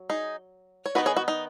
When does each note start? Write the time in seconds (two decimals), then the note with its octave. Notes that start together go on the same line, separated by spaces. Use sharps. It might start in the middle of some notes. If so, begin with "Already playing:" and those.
Already playing: F#3
0.09 D#4 G#4
0.86 C#5
0.95 D#3 B3 D#4 F#4 B4
1.06 G#4 C#5
1.17 F#4
1.28 D#4